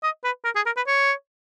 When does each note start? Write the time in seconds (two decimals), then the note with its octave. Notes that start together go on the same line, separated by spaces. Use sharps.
0.03 D#5
0.24 B4
0.45 A#4
0.56 G#4
0.66 A#4
0.77 B4
0.87 C#5